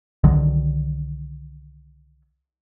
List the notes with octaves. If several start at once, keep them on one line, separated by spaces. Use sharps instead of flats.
C2 D3 D#3 F#3